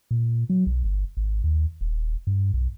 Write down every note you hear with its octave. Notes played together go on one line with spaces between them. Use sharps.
A#2
F#3
B1
G1
G#1
D#2
D#1
G2
B1